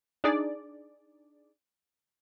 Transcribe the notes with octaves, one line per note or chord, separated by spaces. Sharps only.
D4 D#4 G#4 D5